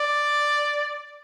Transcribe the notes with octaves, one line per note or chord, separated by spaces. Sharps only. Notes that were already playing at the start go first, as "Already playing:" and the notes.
Already playing: D5